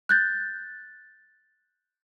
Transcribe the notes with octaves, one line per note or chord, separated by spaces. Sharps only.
F#6 G6 A6